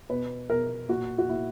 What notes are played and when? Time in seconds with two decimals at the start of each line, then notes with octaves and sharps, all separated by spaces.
0.09 B2 B4
0.49 B2 A#4
0.89 A#2 F#4
1.18 F#4
1.29 A#2 E4